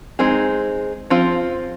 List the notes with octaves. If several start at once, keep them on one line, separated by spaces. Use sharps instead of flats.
G#3 C4 D#4 G#4
F3 C4 F4